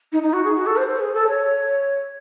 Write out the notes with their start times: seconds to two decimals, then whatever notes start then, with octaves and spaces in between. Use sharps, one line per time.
0.12 D#4
0.22 D#4
0.33 F#4
0.44 G#4
0.55 F#4
0.66 A4
0.77 C5
0.88 C5
0.99 G#4
1.13 A4
1.28 C#5